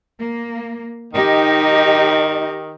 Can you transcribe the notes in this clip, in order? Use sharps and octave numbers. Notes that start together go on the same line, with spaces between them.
A#3
D#3 D#4 G4 D#5